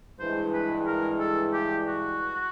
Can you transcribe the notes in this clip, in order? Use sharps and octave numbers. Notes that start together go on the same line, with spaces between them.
G2 E3 G#3 C5
B4
A#4
A4
G4
F#4